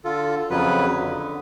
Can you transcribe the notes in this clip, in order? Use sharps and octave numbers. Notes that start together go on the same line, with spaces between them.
D3 F4 A4
F2 C#3 F#3 B4
D3